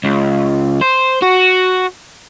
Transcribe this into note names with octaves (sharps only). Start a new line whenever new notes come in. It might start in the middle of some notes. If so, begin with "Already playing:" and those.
C#2
C5
F#4